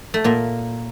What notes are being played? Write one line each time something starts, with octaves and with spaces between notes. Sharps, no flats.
A3
A#2 A#3